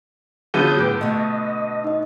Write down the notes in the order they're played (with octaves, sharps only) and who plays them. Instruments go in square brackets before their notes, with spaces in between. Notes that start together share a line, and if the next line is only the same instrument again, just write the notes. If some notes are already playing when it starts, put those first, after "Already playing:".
[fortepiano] D3 B3 F4 [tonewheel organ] F#3 D#6 G6 [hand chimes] G#4
[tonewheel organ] A2 B4 G5 [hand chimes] D6 G6
[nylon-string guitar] B2 A3 [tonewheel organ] D#5
[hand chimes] D#4 D#5